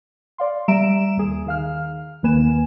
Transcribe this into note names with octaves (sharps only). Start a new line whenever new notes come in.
D5 F5 C6
G3 E5 A#5 D7 E7
D#2 G#4
D#3 F5 F6
D#2 D#3 A#3 B4 G#5 E7